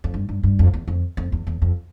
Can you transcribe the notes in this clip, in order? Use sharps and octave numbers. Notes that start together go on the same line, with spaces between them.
F2
G2
G2
G2
F2
E2
F2
F2
E2
E2
F2